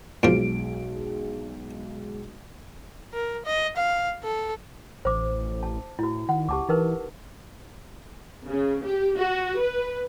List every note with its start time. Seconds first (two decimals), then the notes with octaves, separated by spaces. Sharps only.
0.23 B1 A#2 F3 G#3 D7
3.13 A#4
3.45 D#5
3.77 F5
4.23 A4
5.05 A1 C5 D6
5.63 A5
5.99 A2 E4 F#4
6.29 D#3 F#5
6.49 C#2 G4 A5 D6
6.69 E3 D#4 A#4 B4
8.47 C#3
8.83 G4
9.17 F#4
9.58 B4